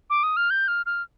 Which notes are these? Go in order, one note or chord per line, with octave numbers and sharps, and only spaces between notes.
D6
D#6
F6
G6
F6
F6